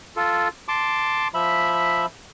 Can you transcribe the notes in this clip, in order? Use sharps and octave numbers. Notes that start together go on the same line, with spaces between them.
F4 A4
A5 C6 D6
F3 E5 B5